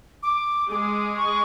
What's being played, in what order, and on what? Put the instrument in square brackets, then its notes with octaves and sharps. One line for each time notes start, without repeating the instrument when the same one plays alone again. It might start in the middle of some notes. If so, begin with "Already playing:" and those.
[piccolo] D6
[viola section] G#3 G#4 [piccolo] D6
[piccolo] C#6